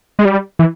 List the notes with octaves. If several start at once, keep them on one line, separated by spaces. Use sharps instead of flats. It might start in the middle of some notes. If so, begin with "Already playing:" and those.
G#3
G3
E3